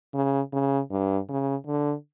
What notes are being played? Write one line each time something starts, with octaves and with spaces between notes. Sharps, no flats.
C#3
C#3
G2
C#3
D3